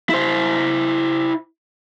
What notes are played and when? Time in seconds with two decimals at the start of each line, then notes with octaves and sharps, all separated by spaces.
0.09 E4 C5